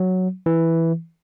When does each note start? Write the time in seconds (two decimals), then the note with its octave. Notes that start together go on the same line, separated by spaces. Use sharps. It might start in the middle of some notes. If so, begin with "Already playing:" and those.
Already playing: F#3
0.46 E3